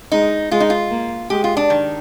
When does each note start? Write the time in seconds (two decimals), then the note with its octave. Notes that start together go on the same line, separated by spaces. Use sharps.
0.12 G#3 D#4
0.51 G#3 F4
0.60 D#4
0.70 F4
0.91 A#3
1.30 G#3 G4
1.44 F4
1.57 D4
1.70 D#3